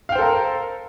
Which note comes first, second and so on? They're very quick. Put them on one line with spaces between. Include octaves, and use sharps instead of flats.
F5 G5 C5 A4 A#4